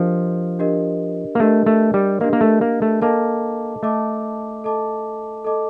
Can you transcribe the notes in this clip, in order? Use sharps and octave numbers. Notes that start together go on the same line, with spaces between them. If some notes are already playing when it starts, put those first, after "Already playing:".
Already playing: F3 D4 G4 A#4 D#5
D4 G4 A#4 D#5
A#3
A3 D4 G4 A#4 D#5
A3
G3
A#3 D4 G4 A#4 D#5
A#3
A3
A#3
A3
A#3 A4 D#5 A5 D6
A3 A4 D#5 A5 D6
A4 D#5 A5 D6
A4 D#5 A5 D6